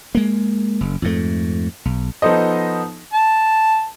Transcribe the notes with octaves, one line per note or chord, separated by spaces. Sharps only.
G#3 A#3
F#1
F2 G#2 A3
B1
F3 B3 D#4 A4 C5 D#5
A5